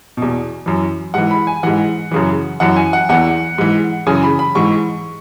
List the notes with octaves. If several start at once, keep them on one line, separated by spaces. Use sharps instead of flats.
E2 B2
F#2 E3
G#2 E3 F#5
B5
G#5
G#2 E3 F#5
F#2 C#3 E3
F#2 E3 F#5
G#5
F#5
E2 E3 F#5
G#2 E3
F#2 C#3 E3 G#5
B5
B5
G#2 E3 C#6